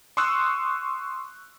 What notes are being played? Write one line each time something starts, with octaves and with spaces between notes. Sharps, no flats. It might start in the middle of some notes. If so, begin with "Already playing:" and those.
C6 C#6 D#6 E6 F#6